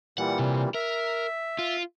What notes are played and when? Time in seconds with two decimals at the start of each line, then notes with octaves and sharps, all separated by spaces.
0.18 A#2 E3 G3 F#5
0.39 C3
0.74 A#4 E5
1.59 F4